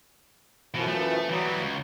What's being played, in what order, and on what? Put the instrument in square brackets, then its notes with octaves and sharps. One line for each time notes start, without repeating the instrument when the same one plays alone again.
[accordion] F#2 E3 F3 [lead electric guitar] B2
[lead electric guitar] A3
[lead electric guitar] E3 G3 [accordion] F#3 B3
[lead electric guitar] C#2